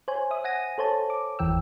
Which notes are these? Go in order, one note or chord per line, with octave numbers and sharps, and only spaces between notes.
C5 C#5 G#5
E5 D#6
F#5 G#5 A#6 D#7
A4 C5 C#5 A5
D6
G1 E2 E3 G5 E6